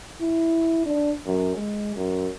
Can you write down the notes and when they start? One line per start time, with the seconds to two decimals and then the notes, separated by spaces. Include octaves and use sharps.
0.22 E4
0.86 D4
1.26 F#2
1.56 G#3
1.95 F#2